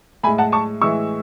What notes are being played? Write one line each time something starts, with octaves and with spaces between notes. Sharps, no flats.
A2 G#3 G#5 B5
F#5 A5
A5 C#6
A2 E3 G#3 C#6 E6